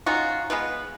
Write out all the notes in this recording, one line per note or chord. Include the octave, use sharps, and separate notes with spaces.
C#4 D#4 F4 F#4
G#3 B3 F4 B4